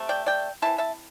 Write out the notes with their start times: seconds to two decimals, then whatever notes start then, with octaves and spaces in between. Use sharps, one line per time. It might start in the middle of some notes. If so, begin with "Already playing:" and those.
Already playing: C3 A3
0.09 D5 G5
0.26 D5 G5
0.62 E3 C4 E4 E5 A5
0.78 E5 A5